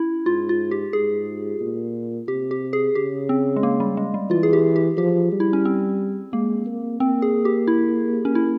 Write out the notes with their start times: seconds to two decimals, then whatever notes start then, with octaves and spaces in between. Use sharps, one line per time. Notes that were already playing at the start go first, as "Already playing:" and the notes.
Already playing: C#4 E4
0.26 G#2 F4
0.49 F4
0.71 G4
0.93 G#2 G#4
1.60 A#2
2.28 C3 G4
2.51 G4
2.73 G#4
2.95 C#3 G4
3.29 C4
3.56 G#3
3.63 A#3
3.80 G3
3.97 G#3
4.14 G3
4.30 E3 F4
4.43 G#4
4.53 G4
4.76 G4
4.97 F3 G4
5.32 G3
5.40 E4
5.53 C#4
5.65 C4
6.33 G#3 A#3
6.66 A#3
7.00 A#3 C4
7.22 G#4
7.45 G4
7.67 E4
8.25 C#4
8.35 E4